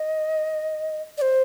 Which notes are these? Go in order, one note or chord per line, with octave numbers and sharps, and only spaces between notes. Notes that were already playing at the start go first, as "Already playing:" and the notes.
Already playing: D#5
D5
C5